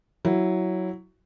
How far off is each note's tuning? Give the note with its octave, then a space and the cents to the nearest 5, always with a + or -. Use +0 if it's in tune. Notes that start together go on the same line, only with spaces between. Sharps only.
F#3 +5 E4 +0